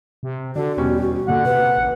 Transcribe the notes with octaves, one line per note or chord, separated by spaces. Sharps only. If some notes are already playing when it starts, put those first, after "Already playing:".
C3
D3 D4 F#4
E2 B2 G3 C#4
A#2 D3 F#5
C3 B4
A1